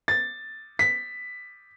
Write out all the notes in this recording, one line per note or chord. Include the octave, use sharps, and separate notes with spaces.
A6
B6